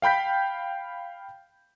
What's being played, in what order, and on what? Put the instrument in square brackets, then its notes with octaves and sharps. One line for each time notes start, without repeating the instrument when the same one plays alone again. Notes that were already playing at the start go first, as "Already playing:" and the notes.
[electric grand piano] F5 G5 B5 G6 B6